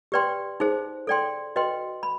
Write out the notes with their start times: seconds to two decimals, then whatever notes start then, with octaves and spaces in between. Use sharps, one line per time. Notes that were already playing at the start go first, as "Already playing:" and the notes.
0.12 G4 B4 D5 G5 C6
0.60 D#4 G#4 C5
1.07 A4 D5 G5 C6
1.56 F#4 B4 D#5 G5 C6
2.03 B5